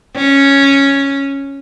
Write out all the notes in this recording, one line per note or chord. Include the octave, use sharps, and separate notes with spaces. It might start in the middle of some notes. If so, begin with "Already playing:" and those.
C#4